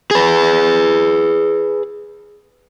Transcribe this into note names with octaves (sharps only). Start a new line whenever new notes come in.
G#4 B4